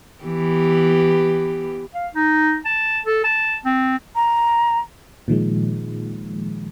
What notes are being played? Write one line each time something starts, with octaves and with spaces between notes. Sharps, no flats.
E3 B3 G4
F5
D#4
A5
A4
A5
C4
A#5
A#2 D#3 F3 G#3